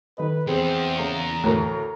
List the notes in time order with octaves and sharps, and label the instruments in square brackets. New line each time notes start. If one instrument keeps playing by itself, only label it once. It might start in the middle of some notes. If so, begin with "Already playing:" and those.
[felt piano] D#3 A4 D#5 [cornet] B4
[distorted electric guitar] E2 [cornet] C4 [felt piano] G#4 B4 C5
[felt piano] C#3 A#3 [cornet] A#5
[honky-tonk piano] D2 A#4 [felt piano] A2